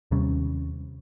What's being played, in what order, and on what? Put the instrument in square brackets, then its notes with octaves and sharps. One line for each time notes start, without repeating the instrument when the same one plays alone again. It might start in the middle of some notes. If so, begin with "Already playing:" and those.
[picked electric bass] D#2 C3 G3 C#4